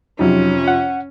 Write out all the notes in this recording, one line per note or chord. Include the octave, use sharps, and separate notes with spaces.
F2 C3 F#3 C#4 D#4 F4
F#5